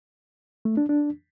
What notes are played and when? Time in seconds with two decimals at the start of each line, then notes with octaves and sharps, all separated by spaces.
0.65 A3
0.77 D4
0.89 D4